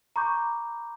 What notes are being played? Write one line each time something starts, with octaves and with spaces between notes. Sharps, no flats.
A#5 B5 C#6 D6 G6